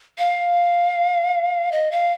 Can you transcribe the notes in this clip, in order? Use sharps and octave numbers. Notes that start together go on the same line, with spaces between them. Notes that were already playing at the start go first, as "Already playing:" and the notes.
F5
D#5
F5